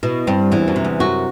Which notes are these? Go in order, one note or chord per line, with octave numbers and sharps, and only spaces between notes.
B2 E4
G2 C4
E2 E3
F#2
C3
E2
F#2 F#4